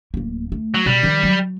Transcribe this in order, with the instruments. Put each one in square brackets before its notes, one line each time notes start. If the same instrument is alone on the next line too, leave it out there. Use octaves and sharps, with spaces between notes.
[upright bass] D1 A#3
A3
[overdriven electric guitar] F#3
[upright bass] B2 [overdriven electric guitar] G3
[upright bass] D#3 F3
F#3